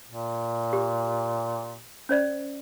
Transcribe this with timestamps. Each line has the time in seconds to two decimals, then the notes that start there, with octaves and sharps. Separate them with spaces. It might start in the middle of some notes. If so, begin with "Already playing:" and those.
0.09 A#2
0.73 G4
2.09 C#4 C5 D5